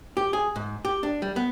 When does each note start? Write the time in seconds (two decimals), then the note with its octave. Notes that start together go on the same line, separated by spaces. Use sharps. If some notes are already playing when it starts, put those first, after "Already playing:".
0.17 G4
0.33 G#4
0.56 G#2
0.85 G4
1.03 D4
1.22 G3
1.36 B3